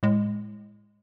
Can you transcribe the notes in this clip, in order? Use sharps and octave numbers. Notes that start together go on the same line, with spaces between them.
A2 G#3